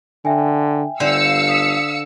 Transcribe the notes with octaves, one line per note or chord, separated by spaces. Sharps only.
D3 E5 G5 G#5
G1 D3 C5 F5 E6 C#7
D#6 B6